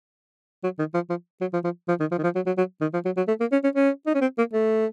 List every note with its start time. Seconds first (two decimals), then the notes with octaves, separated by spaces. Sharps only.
0.63 F#3
0.79 D#3
0.94 F3
1.10 F3
1.41 F#3
1.53 F3
1.64 F3
1.88 F3
2.00 D#3
2.11 F3
2.18 D#3
2.23 F3
2.35 F#3
2.46 F#3
2.58 F#3
2.81 D#3
2.94 F3
3.05 F#3
3.17 F#3
3.28 A3
3.40 A#3
3.52 C#4
3.64 C#4
3.75 C#4
4.07 D#4
4.15 C#4
4.21 C4
4.38 A#3
4.53 A3